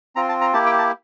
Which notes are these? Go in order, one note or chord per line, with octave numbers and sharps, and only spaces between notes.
C4 F4 A#5
A5
A#5
A#3 E4 G4 A5
G5
A5